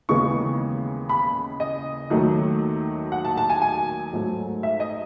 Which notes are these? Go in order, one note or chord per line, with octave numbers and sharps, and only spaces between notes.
D#2 C#3 E3 G#3 B3 C#6
B5
D#5
D#2 D#3 F#3 A3
F#5
A5
A5
G#5
G#5
G#2 F#3 A3
E5
D#5